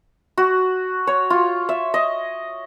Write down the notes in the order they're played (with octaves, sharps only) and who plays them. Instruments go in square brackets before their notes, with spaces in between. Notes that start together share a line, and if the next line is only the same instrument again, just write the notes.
[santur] F#4
C#5
F4
E5
D#5